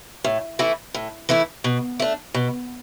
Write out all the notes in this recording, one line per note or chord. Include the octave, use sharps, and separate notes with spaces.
A2
E3 A3 E4
A2
E3 A3 E4
B2
A3 D4
B2